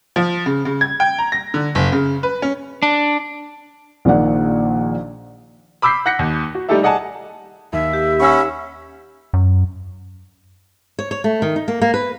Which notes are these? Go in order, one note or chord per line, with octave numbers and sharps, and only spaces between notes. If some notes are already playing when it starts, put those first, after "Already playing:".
F3
C#3
C#3
G#6
G5
A#5
A#6
D3
F#1
C#3
B4
C#4
D4
A#1 A#2 D#3 D5 F#5
B5 D6 E6 G6 B6 C7
F#5 F#6 G6 A#6 B6 C#7
D#2
F#4
G3 A3 D#4 G4 A4 E5
G#4 D5 D#5 F#5 G#5 A5
D#2 E5
G4
C#4 F#5 B5 C#6 E6
F#2
C#5
C#5
A3
D#3
D#4
A#3
A#3
B4